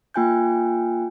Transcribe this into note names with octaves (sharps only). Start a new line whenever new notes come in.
A#3 F4 G5 G#5 F#6 G6